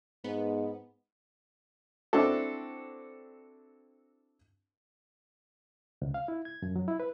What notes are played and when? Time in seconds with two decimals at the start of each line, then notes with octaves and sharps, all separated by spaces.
0.24 G#2 B3
2.13 C4 D4 E4 F#4 A4
6.02 C#2
6.14 F5
6.28 E4
6.45 G#6
6.62 F#2
6.76 F#3
6.88 E4
7.00 B4